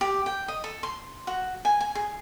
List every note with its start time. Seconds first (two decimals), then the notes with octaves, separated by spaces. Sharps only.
0.01 G4
0.26 G5
0.48 D#5
0.64 A4
0.83 C6
1.27 F#4
1.65 G#5
1.81 G#5
1.95 G#4